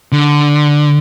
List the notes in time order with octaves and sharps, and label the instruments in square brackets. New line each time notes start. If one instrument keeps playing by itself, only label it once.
[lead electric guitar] D3